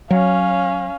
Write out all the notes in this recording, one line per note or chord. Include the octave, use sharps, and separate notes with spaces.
F#3 C#4 F5